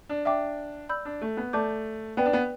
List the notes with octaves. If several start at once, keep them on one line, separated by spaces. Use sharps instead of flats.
D4
D4 E5 G5 D6
D5 B5 E6 G6
D4
A3
B3
A3 D5 A5 D6 G6
B3 B4 D5 G5
D4
B3